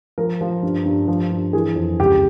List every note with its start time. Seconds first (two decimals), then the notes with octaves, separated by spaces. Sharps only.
0.18 F3 A#4
0.41 F3
0.63 G2
0.86 G2
1.08 F3
1.32 G2
1.53 E3 G#4
1.76 F2
2.00 C#2 G4